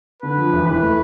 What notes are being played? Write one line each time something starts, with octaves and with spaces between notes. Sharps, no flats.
D3 B4
F3
E1
E3 B4
A3